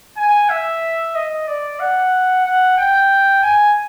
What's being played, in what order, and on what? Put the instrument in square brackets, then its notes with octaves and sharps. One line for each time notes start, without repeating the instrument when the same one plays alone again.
[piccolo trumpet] G#5
E5
D#5
D5
F#5
F#5
G5
G#5